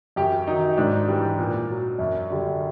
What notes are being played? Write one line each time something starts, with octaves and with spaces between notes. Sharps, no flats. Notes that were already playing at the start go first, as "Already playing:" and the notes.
F#2 G4
D#3 F#3 D#4
G#2 D4
E3 G3
A#2
F#3
F#2
D3 G3